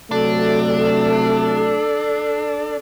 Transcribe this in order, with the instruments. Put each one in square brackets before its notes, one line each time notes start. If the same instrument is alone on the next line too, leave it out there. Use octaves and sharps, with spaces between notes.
[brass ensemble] C3 F#3 A3 [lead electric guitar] D4 [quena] A4